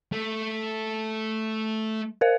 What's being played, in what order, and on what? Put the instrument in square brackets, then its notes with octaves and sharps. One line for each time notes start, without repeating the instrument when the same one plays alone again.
[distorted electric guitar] A3
[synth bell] A#4 C5 F5